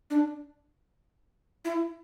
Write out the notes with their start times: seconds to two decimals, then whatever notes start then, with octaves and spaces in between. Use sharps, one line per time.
0.10 D4
1.65 E4